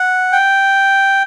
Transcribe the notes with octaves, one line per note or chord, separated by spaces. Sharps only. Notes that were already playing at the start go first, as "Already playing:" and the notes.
Already playing: F#5
G5